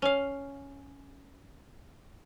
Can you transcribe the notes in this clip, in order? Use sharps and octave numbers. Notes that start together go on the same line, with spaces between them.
C#4 F5